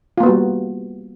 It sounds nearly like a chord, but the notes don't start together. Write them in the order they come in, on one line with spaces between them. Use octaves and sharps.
F4 A#3 B3 F#4 G3